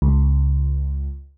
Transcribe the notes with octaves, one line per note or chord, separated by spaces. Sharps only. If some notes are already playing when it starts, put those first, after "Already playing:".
C#2